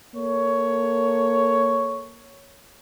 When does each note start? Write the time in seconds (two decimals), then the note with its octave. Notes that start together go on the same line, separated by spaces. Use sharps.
0.15 A#3 A4 C#5